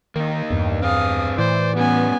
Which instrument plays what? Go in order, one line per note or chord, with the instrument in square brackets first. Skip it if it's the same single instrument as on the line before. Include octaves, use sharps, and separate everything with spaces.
[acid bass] D#3 [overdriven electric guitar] A#3 D#4
[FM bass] E2 [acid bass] G2
[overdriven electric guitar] C4 G#4 [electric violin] F5 D#6
[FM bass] A2 [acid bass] E3 [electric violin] C5 [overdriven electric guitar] D5
[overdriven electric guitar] G3 C#4 [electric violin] B3 G#5